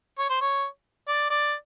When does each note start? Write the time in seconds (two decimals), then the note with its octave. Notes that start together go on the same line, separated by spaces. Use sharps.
0.19 C#5
0.30 C5
0.41 C#5
1.08 D5
1.30 D5